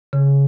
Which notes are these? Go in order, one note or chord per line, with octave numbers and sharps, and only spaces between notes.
C#3